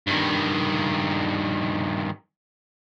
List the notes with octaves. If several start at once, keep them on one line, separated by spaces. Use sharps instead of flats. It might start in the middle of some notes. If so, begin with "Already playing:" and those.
G2 D#3